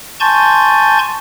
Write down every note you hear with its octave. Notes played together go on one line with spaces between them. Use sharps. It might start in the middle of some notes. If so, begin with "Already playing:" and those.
G#5 A5 C6 C#6 G6 A6